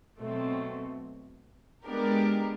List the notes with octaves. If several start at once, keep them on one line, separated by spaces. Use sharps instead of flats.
B2 F#3 A3 C4
G#3 B3 D4 G4 A#4